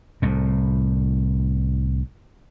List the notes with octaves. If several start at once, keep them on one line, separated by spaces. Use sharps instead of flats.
C2 A2